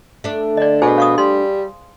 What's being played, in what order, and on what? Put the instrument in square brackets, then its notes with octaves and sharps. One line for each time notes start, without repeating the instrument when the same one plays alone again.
[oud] A3 D4
[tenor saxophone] D3 [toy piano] D5 D#5
[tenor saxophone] B2 [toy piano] G#4 C5 G#5
[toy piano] F5 C#6 D#6
[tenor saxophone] G3 [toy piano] C6